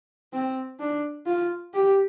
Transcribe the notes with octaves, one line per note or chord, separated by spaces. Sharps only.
C4
D4
F4
G4